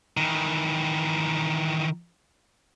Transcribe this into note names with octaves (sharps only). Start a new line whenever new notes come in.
D#3 E3